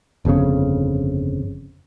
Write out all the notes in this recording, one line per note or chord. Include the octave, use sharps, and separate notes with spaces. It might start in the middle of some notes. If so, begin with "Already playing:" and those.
G1 F2 A#2 C#3